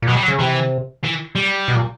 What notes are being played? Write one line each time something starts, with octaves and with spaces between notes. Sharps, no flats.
A#2
B2 F#3
G3
F#3
C#3
C3 E3
E3
G3
B2
A#2